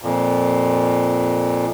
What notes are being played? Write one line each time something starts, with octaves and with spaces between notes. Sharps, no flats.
F2 A#2